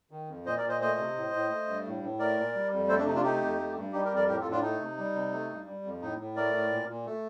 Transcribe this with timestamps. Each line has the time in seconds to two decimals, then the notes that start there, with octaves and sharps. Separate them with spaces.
0.11 D#3
0.29 F2
0.46 A#2 C5 D#5
0.57 A#4 D5
0.63 A#2
0.68 C5 D#5
0.80 A3 C5 D#5
0.98 C3
1.15 A2
1.33 A2
1.50 A3
1.67 G2
1.85 A2
2.02 A2
2.19 A3 A#4 D5
2.37 A#2
2.55 G3
2.72 F2
2.88 A3 A4 C5
2.98 D4
3.06 C3 D#4
3.15 D4 F4
3.24 A3 D#4 G4
3.41 F2
3.58 A3
3.75 G2
3.92 G3 D#4 G4
4.04 G4 A#4
4.11 F2
4.16 A#4 D5
4.27 A2 G4 A#4
4.39 F4 A4
4.45 A2
4.51 D4 F4
4.62 A3 D#4
4.80 C3
4.98 G3
5.14 C3
5.32 A3
5.50 G2
5.66 G3
5.84 F2
6.01 A2 D#4
6.19 A2
6.36 A3 A#4 D5
6.53 A2
6.71 A#2
6.88 A#2
7.06 A3